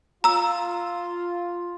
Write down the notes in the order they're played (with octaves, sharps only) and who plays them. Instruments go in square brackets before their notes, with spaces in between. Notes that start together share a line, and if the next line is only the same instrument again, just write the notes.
[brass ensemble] F4 [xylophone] A#5 E6